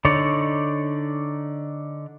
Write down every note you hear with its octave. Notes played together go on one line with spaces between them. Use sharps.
D3 D#4 C#5 D5